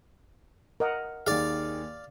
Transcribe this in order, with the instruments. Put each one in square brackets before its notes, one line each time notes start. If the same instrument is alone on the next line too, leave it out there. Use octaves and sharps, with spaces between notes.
[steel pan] A#4 D#5 F#5
[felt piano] D#2 D#3 G#4 [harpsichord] D5 F5